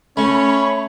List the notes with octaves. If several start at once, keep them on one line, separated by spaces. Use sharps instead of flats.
A3 C#4 C#5 B5